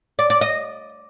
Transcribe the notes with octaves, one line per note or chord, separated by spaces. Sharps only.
D5
D5
D#5